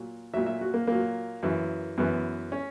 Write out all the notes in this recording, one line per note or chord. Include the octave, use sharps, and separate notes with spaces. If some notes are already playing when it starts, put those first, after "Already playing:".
Already playing: A#2 F#3
A#2 F#3 E5
E5
F#4
A#3
A#2 F#3 A#3
F#2 E3
F#2 E3 B3
C#4